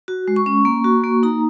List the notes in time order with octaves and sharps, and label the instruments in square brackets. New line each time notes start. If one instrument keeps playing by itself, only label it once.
[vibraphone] F#4
G#3
C#6
C#4
A#3
F#4
A#3
D#4 A#5